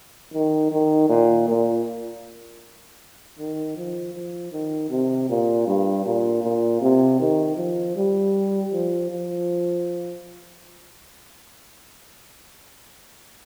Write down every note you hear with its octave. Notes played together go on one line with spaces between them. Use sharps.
D#3
D#3
A#2
A#2
D#3
F3
F3
D#3
C3
A#2
G2
A#2
A#2
C3
D#3
F3
G3
F3
F3